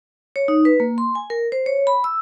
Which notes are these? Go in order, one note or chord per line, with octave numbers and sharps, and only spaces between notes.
C#5
D#4
B4
A#3
C6
G#5
A#4
C5
C#5
B5
E6